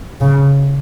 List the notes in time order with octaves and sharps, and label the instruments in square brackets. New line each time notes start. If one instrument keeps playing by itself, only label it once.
[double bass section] C#3